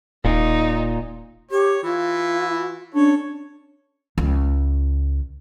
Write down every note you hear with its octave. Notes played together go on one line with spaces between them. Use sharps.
D#1 A#2 D#4
G4 C#5
E3 F4
C#4 D4 A4 C#5
C#2